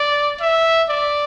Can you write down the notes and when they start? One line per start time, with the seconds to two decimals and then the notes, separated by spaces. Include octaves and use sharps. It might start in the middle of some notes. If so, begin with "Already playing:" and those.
Already playing: D5
0.41 E5
0.88 D5